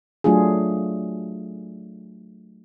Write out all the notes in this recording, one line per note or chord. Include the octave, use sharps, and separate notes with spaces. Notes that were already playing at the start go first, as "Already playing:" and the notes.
F#3 A3 D4 F4 G#4